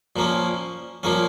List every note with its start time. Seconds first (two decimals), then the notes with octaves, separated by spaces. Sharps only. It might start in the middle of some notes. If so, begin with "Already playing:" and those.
0.16 A#2 F3 A#3 C#4
1.03 A#2 F3 A#3 C#4